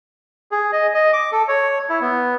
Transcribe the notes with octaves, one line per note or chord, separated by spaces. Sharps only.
G#4
D#5
D#5
D6
A4
C#5
E4
B3